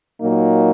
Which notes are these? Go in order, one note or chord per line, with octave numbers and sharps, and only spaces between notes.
A#2 F#3 A#3 D#4